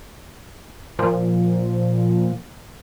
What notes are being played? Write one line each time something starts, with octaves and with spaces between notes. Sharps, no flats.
A#2 F3